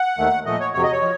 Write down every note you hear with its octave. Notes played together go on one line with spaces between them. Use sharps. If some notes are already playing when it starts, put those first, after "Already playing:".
Already playing: F#5
D#2 D#3 A3
A#2 F3 A3 D#5
C#5
F2 C3 F#3 C#5
D#5
C#5
F3